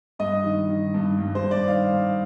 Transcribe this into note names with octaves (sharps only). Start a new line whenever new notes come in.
G2 D#5
D#3
D#3
G2
G2
C5
G2
D5
D#3 F5
G2